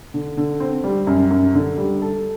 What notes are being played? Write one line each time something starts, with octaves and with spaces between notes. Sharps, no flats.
D3
D3
C4
G3
F#2
F#2
D3
G3
A4